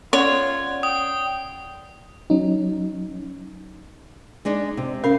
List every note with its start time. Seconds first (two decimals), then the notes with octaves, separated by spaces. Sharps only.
0.13 C#4 F4 C#5 D5 F#5
0.83 G5 D#6
2.30 F#3 C#4 D#4
4.45 G#3 D4 D#4
4.77 C3
5.04 C#4 A#4 F5